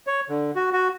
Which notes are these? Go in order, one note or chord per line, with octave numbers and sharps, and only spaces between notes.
C#5
D3
F#4
F#4